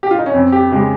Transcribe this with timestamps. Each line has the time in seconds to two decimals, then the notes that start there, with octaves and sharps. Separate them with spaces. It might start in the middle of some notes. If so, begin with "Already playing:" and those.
0.03 G4
0.11 F4
0.19 D#4
0.26 C#4
0.33 F2 C4
0.52 G4
0.71 C#3 G#3 G4